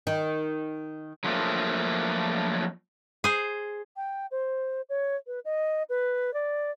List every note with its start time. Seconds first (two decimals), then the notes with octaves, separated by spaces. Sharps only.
0.07 D#3
1.24 F3 F#3 A3 A#3
3.24 G#4 C5
3.96 G5
4.31 C5
4.89 C#5
5.27 B4
5.45 D#5
5.89 B4
6.34 D5